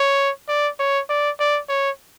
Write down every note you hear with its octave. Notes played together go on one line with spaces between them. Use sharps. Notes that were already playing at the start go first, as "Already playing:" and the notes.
Already playing: C#5
D5
C#5
D5
D5
C#5